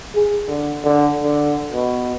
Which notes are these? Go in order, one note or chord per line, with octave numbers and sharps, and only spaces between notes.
G#4
D3
D3
D3
B2